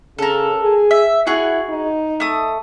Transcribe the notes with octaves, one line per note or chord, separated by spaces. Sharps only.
C#3 A4 A#4
G#4
E5
E4 F#4 G#4 F#5
D#4
A3 D#6